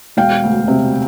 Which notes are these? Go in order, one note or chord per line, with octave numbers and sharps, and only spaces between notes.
E1 F5 G5
D2
C3